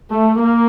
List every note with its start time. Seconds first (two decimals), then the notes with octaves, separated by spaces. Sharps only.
0.11 A3
0.38 A#3